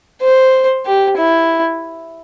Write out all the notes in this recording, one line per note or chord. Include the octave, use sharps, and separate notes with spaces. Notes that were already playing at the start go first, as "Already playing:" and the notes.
C5
G4
E4